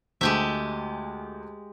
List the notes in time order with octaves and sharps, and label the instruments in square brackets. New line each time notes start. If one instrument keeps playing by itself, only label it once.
[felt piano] D2 A3 [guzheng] G#3 G4 E5